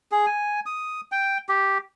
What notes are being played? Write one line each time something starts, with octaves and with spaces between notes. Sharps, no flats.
G#4
G#5
D#6
G5
G4